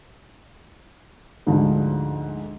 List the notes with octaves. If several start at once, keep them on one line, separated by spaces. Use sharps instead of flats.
D2 G#2 D3 F3